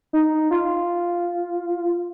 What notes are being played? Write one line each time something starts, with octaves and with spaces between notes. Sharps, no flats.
D#4
F4